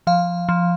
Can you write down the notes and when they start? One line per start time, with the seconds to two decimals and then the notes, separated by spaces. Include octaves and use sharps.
0.07 F3 F5
0.49 F3